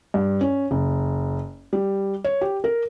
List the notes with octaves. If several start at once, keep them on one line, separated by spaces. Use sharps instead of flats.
G2
C#4
F#1
G3
C#5
G4
A#4